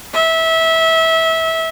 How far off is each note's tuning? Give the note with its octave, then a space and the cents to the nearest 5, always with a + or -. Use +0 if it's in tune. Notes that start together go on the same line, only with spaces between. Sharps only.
E5 -20